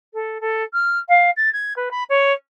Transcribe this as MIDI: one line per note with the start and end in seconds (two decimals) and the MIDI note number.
0.14 0.38 69
0.41 0.63 69
0.73 0.99 89
1.09 1.30 77
1.37 1.51 93
1.53 1.73 92
1.76 1.89 71
1.91 2.04 83
2.09 2.33 73